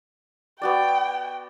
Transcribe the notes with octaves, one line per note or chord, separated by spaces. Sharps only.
B3 F#4 D5 G5